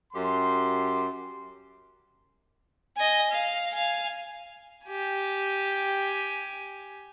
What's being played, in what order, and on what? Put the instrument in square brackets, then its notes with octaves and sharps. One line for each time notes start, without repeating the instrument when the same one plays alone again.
[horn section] F#2 G4 C6
[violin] D#5 G#5
F5
F5 G#5
[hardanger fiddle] G4 G#5